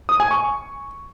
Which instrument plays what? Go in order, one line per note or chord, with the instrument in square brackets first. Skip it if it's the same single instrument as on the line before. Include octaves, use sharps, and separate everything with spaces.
[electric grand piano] D#6
G#5
C#6